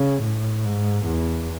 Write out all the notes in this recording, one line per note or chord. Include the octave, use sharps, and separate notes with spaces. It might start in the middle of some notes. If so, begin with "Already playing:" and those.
Already playing: C#3
A2
G#2
E2